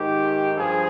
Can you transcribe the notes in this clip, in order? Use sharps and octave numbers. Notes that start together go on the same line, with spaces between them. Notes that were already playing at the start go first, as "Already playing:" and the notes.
Already playing: G#2 D#3 G4
G2 F3 G#4